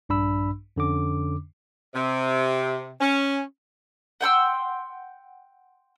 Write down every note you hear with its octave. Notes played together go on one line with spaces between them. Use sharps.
A#1 G2 D4 B5 E6
F2 D3 C#4 D6
C3
C#4
F#5 G5 C6 E6